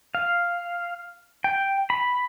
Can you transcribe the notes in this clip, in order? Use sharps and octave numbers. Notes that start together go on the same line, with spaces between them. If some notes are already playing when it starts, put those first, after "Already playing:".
F5
G5
B5